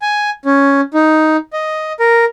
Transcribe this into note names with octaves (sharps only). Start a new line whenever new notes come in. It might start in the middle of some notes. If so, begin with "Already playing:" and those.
G#5
C#4
D#4
D#5
A#4